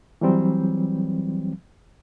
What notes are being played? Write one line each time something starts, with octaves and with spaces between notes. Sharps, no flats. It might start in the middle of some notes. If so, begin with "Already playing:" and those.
E3 F#3 G3 C4